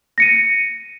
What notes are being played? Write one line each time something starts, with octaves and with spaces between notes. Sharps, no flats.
A#6 C#7 D#7